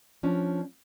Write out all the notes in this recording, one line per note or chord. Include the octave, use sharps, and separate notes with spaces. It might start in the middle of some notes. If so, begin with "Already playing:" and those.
F3 C#4 D4